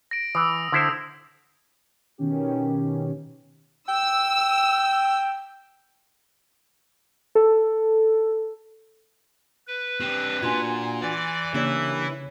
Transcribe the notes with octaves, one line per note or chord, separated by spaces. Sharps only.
A#6 D7
E3 D#6 E6
D3 E4 C5
B2 D#3 C#4 G4
G5 E6
A4
B4
C4 D4 G4
A#2 D4 F4 F#4 G#5 C6 G#6
E3 D5
C#3 A#3 D4 E4 G4 C#5 F#6